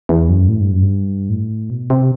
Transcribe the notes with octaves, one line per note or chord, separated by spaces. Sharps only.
E2
F#2
A2
G2
F#2
G2
A2
B2
C3